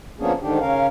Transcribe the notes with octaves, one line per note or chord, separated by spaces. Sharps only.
F3 A#3 B3 C#4 D4 G#4
G#2 D3 D#3 D4 G4
C#3 C#4 A#4 F5